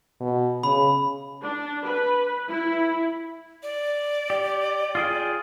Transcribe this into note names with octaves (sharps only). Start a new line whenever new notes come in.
B2
C#3 B5
D4
B4
E4
D5
G4
F4 G#4 G5